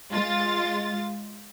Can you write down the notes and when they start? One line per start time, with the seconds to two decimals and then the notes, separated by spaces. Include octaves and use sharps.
0.11 G#3 F4 A6